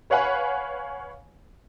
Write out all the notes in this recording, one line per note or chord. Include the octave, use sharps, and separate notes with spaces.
B4 C#5 F5 F#5 G#5 B5